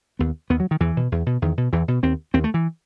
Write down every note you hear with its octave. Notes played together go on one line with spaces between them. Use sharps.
D#2 B3
D#2 B3
F#3
D#3
E2 E3
B2
E2
B2
E2 D#3
B2
E2 E3
B2
D#2 C4
D#2 C4
A3
E3